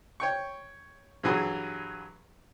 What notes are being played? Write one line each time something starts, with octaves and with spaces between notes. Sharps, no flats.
C#5 G5 C#6
G2 E3 F#3 G#4 B4